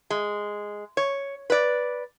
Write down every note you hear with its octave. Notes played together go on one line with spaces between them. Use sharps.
G#3
C#5
B4 D5